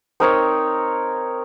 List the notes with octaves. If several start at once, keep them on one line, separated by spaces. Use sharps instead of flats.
C4 D#4 A#4 C#5